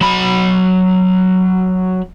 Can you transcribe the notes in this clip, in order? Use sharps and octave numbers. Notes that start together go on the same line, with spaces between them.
F#3 B5